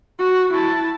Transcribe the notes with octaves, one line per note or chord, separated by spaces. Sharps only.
F#4
E4 A5